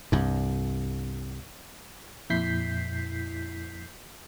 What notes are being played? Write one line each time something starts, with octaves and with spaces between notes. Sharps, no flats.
C2 G2
F2 A#2 E4 G6 B6 C7